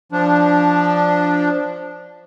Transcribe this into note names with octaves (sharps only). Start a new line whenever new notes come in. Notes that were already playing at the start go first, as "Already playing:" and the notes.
F3 D4